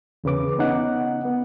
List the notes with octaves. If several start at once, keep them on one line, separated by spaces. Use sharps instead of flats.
E2 C#3 B4 D6
B3 C#4 D#4 F#5
B3